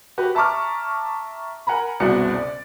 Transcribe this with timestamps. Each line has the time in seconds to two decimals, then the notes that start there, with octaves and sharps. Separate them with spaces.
0.18 F#4 G4 B4
0.35 E5 A5 A#5 C#6 D6 F6
1.67 A#4 F#5 G#5 A#5 B5
2.00 F#1 C2 B2 F#4 D5 C#7
2.34 D5